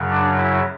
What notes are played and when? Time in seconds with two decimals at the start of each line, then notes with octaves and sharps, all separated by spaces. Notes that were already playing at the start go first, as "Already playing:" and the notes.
Already playing: F#2 C#3 F#3
0.10 D4
0.38 E4